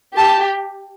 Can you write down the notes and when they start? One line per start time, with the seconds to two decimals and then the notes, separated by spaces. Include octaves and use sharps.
0.17 G4 A5